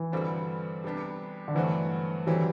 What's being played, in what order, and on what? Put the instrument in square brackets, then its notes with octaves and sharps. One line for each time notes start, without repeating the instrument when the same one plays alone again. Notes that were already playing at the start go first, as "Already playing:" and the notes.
Already playing: [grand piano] E3
[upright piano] G2 D3 G3 C4 F#4
C3 G3 B3 D4 G4
[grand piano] D3
[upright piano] G2 F#3 A3 C4 F#4 [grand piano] E3
[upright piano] D3 F#3 C4 G4 [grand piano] E3 G3